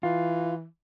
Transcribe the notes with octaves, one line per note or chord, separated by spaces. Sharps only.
E3 F4